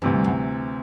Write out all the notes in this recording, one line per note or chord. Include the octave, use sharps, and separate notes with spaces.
D2 G2 C3 E3
F#2